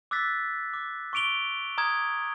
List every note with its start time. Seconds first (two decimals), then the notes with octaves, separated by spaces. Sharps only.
0.11 D6 E6 F#6 A6 B6
0.73 D6
1.13 C#6 D6 D7 F7 G7
1.78 A#5 D#6 F6 G#6